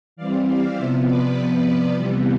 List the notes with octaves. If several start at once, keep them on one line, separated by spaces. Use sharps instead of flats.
E3 G3 C4 D5 F5
D5 F5
C3 F3 B3 C5 E5
B4 D5
C3 F3 B3
C3 E3 G3 B3